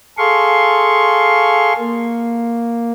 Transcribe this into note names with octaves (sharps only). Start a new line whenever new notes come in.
G#4 A4 F5 C6 C#6
A#3